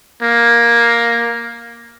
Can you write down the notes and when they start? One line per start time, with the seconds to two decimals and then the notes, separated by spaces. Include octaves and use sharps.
0.23 A#3